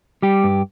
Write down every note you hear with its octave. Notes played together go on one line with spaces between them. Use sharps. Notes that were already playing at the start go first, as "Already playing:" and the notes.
G3 G4
G2